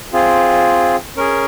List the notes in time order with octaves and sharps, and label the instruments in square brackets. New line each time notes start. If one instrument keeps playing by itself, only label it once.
[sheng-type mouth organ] C4 F4 G#4
C#4 G#4 A#4